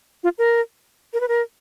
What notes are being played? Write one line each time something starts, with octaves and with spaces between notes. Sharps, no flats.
F4
A#4
A#4
B4
A#4